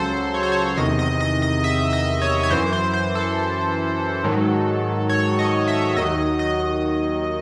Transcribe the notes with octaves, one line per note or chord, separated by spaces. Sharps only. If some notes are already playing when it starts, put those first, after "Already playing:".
Already playing: C#2 C#3 F#3 A4 C5
C#5
C5
C#5
E2 C3 D#3 D#5
D#5
D#5
D#5
E5
D#5
C#5
C#5
F#2 E3 C5
C5
C5
A4
G#2 D#3 F#3
C#5
D#5
E5
D#2 D#3 F#3 D#5
D#5